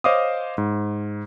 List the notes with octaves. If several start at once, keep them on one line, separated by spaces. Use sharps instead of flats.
C5 C#5 D#5 F5 D6 D#6
G#2